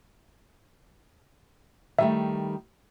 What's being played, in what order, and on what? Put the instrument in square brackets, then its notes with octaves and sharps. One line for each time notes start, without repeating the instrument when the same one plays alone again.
[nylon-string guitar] D#3 G3 A3 [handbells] E5